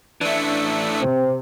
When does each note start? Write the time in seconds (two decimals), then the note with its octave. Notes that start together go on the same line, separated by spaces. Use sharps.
0.21 E3 A3 D4 E5
1.01 C3 C4